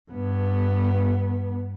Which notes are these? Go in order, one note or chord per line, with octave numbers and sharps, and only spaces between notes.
G2 B3